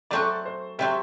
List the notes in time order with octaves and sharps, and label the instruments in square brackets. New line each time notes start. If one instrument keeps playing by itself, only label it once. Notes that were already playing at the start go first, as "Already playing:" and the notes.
[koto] F#3 A3 C4 F#4 [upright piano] D5
[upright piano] C5
[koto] C3 F#3 C4 [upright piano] E5 G5